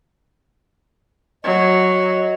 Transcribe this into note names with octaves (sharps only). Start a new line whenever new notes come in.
F#3 D#5